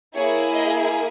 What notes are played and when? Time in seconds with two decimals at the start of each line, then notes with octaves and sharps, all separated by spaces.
0.15 A#3 E4 G#4 C#5
0.53 D#5